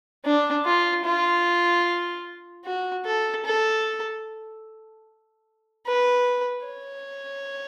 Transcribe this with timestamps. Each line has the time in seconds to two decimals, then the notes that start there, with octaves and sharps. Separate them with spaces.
0.25 D4
0.65 F4
1.05 F4
2.65 F#4
3.06 A4
3.46 A4
5.87 B4
6.67 C#5